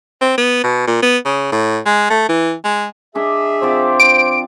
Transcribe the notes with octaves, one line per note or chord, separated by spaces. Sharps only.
C4
B3
B2
A#2
B3
C#3
A2
G#3
A3
E3
G#3
D4 G#4 D#5 E5
F3 C4 C5 D5
D6 D7